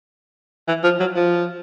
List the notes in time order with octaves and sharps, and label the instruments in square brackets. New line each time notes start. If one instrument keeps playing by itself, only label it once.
[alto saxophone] E3
F3
F#3
F3